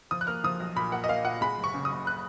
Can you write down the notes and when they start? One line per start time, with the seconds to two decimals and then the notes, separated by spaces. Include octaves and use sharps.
0.11 F3 D#6
0.21 F#6
0.27 A#3 F6
0.44 F3 D#6
0.60 B1
0.76 A#2 B5
0.92 A#3 F#5
1.04 D#5
1.08 A#3 F5
1.25 A#2 F#5
1.41 G#3 B5
1.58 F#1
1.64 C#6
1.74 C#3
1.85 D#6
1.90 F#1
2.07 F#6